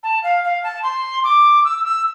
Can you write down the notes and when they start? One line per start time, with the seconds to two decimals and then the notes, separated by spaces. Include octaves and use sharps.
0.03 A5
0.23 F5
0.44 F5
0.64 A5
0.83 C6
1.24 D6
1.64 E6
1.85 E6